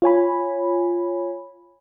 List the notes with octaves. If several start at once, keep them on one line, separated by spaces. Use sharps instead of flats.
F4 C#5 G#5 B5